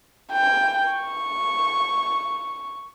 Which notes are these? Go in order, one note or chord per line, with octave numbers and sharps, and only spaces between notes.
G5
C#6